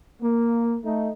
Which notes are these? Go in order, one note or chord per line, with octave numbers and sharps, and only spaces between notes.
A#3
A3 D#4